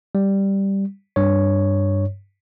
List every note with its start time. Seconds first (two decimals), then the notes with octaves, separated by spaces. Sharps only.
0.15 G3
1.16 G2 C#5